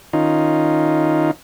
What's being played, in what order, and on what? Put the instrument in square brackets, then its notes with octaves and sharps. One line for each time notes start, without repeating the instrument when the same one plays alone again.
[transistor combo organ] D#3 C#4 D#4 F4